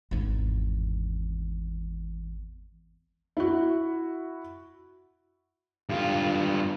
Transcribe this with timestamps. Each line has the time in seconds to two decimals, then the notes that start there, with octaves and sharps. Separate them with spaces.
0.11 G#1 E2
3.37 E4 F#4
5.89 G2 F4